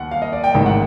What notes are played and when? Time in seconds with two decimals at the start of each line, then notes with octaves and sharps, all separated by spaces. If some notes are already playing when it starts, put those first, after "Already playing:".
Already playing: D#2 F#5
0.11 F5
0.22 D#5
0.33 D5
0.44 G5
0.54 A1 G#2 D#3
0.66 F#5